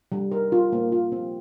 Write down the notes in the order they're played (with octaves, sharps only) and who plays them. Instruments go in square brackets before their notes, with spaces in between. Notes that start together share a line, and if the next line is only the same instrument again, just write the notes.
[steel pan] G3
A#4
F4
A#3
F4
C4